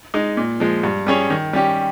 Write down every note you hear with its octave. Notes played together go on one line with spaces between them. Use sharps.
G#3 D#4
A#2
F3 G#3
G2
G3 C#4 G#4 C#5
D#3
G3 C#4 G4